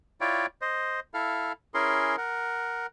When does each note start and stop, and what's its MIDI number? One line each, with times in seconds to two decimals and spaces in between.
0.21 0.46 64
0.21 0.46 65
0.21 0.46 73
0.21 0.46 74
0.21 0.46 79
0.61 1.00 72
0.61 1.00 75
1.14 1.53 64
1.14 1.53 69
1.14 1.53 77
1.74 2.16 61
1.74 2.16 64
1.74 2.16 68
1.74 2.16 70
1.74 2.16 84
2.18 2.86 70
2.18 2.86 78